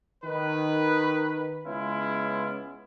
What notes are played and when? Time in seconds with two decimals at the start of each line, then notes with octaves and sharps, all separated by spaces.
0.25 D#3 B4
1.66 C#3 G#3 B3 C#4 E4 F4